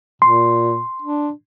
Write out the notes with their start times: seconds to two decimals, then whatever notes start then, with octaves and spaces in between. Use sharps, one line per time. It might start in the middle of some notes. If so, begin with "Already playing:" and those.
0.22 A#2 C6
1.02 D4